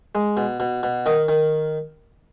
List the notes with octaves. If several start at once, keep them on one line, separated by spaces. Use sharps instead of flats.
G#3
B2
B2
B2
D#3 D#5
D#3